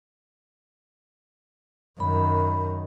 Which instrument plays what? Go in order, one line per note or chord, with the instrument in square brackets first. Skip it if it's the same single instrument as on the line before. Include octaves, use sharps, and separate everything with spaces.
[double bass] F#2 D#3 [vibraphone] B5